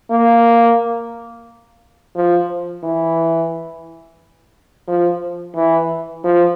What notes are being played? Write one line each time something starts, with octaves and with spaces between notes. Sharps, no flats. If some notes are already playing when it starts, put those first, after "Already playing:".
A#3
F3
E3
F3
E3
F3